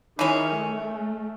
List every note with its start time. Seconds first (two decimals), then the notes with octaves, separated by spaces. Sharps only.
0.19 D#3 E3 G#3 C#4
0.57 A3